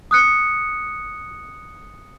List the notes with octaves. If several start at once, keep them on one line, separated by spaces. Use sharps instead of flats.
D#6 F#6 C#7